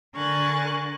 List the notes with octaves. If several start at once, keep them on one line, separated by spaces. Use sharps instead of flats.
D3 A#4 G#5 C#6 F#6 A6